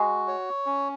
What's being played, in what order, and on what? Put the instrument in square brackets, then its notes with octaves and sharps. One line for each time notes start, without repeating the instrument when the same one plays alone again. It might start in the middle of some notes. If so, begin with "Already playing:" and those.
Already playing: [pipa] G#3 [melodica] F#4
[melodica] C#5
C#4